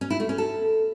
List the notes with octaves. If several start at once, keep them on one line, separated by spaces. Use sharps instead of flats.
C#4
E4
A3
C#4
A4